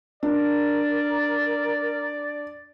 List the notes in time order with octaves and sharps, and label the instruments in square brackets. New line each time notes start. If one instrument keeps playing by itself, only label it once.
[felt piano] D4 [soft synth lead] A#4 [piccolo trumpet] D5